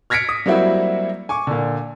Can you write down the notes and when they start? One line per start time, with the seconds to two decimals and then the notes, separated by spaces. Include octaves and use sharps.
0.10 F6 G#6 A#6 B6 C#7 D7
0.29 D#6
0.46 F#3 G3 A#3 C4 E4 F#4
1.29 G#5 C#6 D6
1.47 A#2 D3